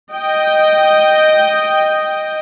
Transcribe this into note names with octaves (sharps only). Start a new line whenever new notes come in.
D#5 G5